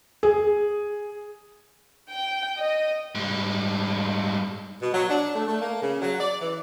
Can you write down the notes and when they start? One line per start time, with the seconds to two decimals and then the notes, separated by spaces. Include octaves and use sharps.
0.23 G#4
2.09 G5
2.57 D#5
3.15 G#2 G3
4.82 B2
4.93 F#3
5.09 D4
5.35 A3
5.47 A3
5.61 A#3
5.82 C#3
6.01 F#3
6.20 D5
6.41 E3